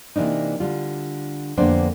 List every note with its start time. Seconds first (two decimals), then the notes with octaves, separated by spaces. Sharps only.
0.16 C3 E3 A#3 D4 D#4
0.60 D3 G3 F4
1.57 F2 D3 A#3 B3 D4 C5